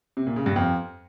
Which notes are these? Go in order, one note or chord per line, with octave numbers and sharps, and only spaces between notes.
C3
A#2
C#3
G2
F2